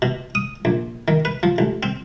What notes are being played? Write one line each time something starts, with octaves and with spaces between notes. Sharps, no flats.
B2
D#6
A#1
D#3
B4
F3
A1
C4